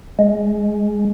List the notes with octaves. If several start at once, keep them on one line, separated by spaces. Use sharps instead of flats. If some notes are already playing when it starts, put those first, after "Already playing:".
G#3